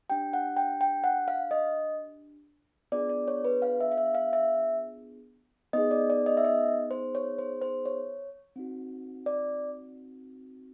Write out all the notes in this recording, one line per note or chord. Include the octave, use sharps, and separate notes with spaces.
D4 G4 G5
F#5
G5
G5
F#5
F5
D#5
B3 D4 F4 G#4 D5
D5
C#5
B4
F5
E5
F5
E5
F5
E5
B3 D#4 G#4 D#5
D5
D5
D#5
E5
D#5
C5
C#5
C5
C5
C#5
C4 D#4 F#4
D5